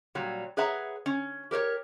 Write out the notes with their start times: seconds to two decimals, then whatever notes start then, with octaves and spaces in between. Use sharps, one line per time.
0.15 A#2 F#3 G3
0.57 G#4 B4 C#5 E5 F#5 A#5
1.06 C#4
1.51 G4 A#4 C5 C#5